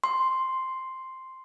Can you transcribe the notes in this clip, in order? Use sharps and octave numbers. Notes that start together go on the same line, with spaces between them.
C6